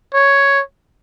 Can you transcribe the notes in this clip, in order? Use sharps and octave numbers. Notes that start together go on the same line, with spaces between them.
C#5